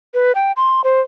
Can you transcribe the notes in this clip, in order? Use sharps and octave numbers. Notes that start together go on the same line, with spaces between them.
B4
G5
C6
C5